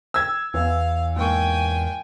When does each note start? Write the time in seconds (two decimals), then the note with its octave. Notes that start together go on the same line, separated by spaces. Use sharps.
0.14 E6 G#6
0.54 E2 E3 F5
1.16 G#2 A#3 G5 G#5 C#6